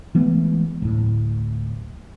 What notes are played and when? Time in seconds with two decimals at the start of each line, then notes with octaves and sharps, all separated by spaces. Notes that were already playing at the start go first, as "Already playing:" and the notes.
0.15 E3 G#3 A3 B3
0.82 D1 A2